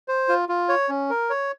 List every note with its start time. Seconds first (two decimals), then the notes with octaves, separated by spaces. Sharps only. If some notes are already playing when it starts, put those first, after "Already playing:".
0.08 C5
0.29 F4
0.49 F4
0.69 C#5
0.89 C#4
1.10 A#4
1.30 C#5